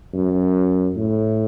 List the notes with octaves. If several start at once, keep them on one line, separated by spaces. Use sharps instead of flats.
F#2
A2